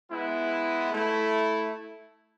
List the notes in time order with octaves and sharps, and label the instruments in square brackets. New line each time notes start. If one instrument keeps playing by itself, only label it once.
[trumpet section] G#3 B3 E4
A3 E4